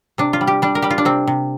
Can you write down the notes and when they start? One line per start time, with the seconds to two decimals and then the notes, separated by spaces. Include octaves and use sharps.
0.18 C3 D4
0.33 F4
0.41 G3
0.47 G4
0.62 G3 D4
0.75 A#4
0.82 G3 G4
0.91 F4
0.98 D4
1.05 C3 C4
1.27 C3